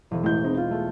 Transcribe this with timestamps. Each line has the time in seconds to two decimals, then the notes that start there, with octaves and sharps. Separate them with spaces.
0.11 E1 E3
0.23 A1 G#3 E4 G6
0.44 C4 D#4
0.57 F4
0.71 A3